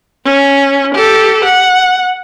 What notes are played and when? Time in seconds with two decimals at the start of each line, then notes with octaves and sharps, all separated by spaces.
0.25 C#4
0.94 G4 A4
1.44 F#5